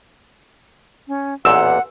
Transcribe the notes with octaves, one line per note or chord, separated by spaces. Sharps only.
C#4
A1 E2 A#2 F#5 E6